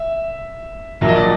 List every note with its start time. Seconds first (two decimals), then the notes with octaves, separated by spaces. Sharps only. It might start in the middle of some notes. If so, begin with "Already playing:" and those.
Already playing: E5
1.01 A#1 A#2 F#3 E5
1.09 D#5
1.15 D5